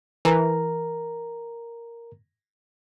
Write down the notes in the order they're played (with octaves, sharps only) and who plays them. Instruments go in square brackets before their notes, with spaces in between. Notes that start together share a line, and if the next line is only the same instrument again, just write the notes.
[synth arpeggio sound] E3 [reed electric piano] A#4 A#5